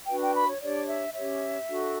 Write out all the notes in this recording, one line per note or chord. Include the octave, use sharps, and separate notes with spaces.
D4 F#4 B4 G5
G5
B5
C#5
D4 G4 C#5 D5
E5
C#4 G4 C#5 E5
D4 F#4 A4